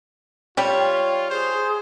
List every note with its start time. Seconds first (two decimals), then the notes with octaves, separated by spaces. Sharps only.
0.57 G3 F4 G4 C#5 G5
1.30 G#4 C5